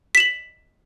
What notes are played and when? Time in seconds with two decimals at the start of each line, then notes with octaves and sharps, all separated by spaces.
0.15 B6
0.17 E7
0.20 F#7